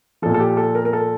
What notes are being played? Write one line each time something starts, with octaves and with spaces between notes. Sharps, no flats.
A#2 F3 A4
A4
G4
A4
A#4
A#4
A4